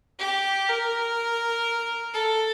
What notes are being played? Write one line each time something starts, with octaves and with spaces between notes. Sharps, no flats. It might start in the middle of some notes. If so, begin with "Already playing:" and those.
G4
A#4
A4